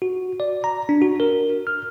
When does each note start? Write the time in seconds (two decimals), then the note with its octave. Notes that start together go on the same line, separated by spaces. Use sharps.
0.02 F#4
0.40 D5
0.64 A#5
0.89 D4
1.02 F#4
1.20 A#4
1.67 F6